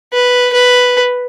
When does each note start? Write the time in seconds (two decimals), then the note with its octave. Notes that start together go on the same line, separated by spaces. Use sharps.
0.13 B4
0.53 B4